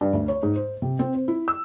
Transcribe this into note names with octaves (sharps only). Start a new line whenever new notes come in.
G2
D2
C#5
G#2
C5
C3
C4
C5
E4
E6